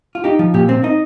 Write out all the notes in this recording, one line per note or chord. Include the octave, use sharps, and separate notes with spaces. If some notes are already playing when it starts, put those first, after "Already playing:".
F4
D#4 G4
F3
A#2 G4
C4
D#4 D#5